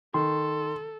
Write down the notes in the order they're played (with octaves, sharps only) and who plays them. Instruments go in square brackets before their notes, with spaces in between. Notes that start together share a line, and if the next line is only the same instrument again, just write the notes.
[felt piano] D#3 [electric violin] A4 [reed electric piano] C6